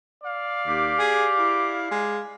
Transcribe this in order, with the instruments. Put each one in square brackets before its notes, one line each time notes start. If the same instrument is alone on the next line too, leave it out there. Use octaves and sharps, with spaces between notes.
[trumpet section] D5 F5
[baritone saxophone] D#2 [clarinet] G4
[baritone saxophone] G#4
E4
G#3